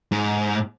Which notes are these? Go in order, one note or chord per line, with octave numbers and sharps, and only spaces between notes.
G#2